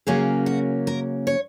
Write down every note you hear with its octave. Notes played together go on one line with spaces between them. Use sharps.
C#3 F#3 A#3 C#4 G#4
F#4
A#4
C#5